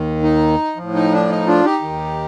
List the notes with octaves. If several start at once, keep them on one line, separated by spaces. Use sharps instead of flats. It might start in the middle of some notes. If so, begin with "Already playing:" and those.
Already playing: D#2 D#3
D#4
A2 F3
D#4
D4
D#4
D4 F4
D#4 G4
D#2 D#3